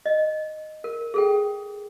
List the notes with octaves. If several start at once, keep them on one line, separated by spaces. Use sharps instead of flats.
D#5
A#4
G#4 A4 G5